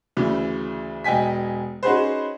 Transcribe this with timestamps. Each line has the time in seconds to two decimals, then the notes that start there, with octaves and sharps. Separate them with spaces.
0.17 D2 C#3 E3
1.04 E1 D#5 G5 G#5 B6
1.83 C#4 D#4 F#4 G#4 B4 C5